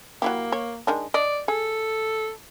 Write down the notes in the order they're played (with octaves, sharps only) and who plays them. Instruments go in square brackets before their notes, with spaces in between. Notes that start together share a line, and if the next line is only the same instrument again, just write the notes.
[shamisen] F#3 E4 G4 [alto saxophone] A#3
[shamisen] C#5
D#3 G#3 D4
[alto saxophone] D5 [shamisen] D#5
[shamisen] G#4 [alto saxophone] A4